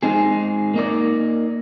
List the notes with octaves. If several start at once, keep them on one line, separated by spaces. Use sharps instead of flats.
G#3 C4 D#4 G#4
A#3 D#4 A#4 D5